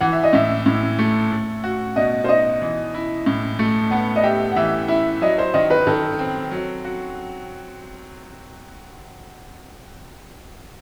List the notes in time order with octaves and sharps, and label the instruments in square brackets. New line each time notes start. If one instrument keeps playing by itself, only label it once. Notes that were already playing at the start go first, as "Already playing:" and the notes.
[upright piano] E3 [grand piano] F#5
[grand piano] E5
D#5
[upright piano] A2 [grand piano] E5
[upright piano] A2
A3
A3
F#4
[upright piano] B2 [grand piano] D#5
[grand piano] C5
[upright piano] D#4 [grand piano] D#5
[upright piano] E3
E4
A2
A3
[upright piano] B3 [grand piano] F#5
[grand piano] D#5
[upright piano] G4 [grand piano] E5
[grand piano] F#5
[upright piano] E3 [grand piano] E5
[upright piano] E4 [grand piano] E5
[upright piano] F#3 [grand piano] D#5
[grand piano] C5
[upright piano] D#3 [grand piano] D#5
[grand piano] B4
[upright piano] D#3 [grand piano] A4
[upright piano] C4
F#3
F#4